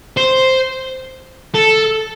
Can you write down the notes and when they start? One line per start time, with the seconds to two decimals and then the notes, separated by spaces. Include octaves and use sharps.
0.17 C5
1.54 A4